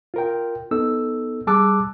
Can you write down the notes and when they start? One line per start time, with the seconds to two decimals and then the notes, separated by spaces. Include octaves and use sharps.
0.14 F4 A#4 G5
0.71 B3 D#4 A4 E6
1.47 G3 G#4 A5 D6 E6 F#6